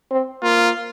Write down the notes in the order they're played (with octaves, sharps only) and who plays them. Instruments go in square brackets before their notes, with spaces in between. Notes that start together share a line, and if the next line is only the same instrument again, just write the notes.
[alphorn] C4
[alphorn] A#3 [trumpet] F4